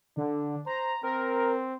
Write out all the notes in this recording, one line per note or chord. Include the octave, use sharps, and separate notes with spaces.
D3 D4
C5 A#5
C4 A#4